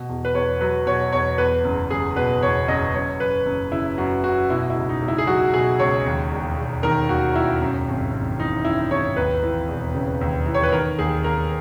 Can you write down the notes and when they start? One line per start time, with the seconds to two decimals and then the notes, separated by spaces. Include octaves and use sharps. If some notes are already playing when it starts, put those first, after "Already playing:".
Already playing: B2
0.09 E2
0.25 B4
0.35 E2 C#5
0.61 F#3 B4
0.86 B2 C#5
1.12 E2 C#5
1.38 E2 B4
1.64 F#1
1.90 F#1 G#4
2.16 B2 B4
2.42 E2 C#5
2.68 F#1 D#5
2.94 F#2 C#5
3.20 F#1 B4
3.46 F#1
3.71 C#3 E4
3.98 F#2 F#4
4.24 F#1 F#4
4.50 B2 E4
4.70 E4
4.76 C#2
4.89 D#4
5.02 C#2
5.08 E4
5.18 G#4
5.27 F#3 F#4
5.53 B2 G#4
5.79 C#2 C#5
6.06 D#2
6.31 E1
6.57 E1
6.83 D#3 A#4
7.09 D#2 F#4
7.35 E1 E4
7.61 F#2
7.88 G#1
8.13 G#1
8.39 E3 D#4
8.65 F#2 E4
8.91 G#1 C#5
9.16 D#2 B4
9.43 E3
9.68 E1
9.95 C#3
10.21 D#2
10.46 E3
10.54 C#5
10.63 B4
10.72 D#3 A#4
10.99 D#2 G#4
11.24 D#2 A#4